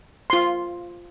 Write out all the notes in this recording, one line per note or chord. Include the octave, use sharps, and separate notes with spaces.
F4 C6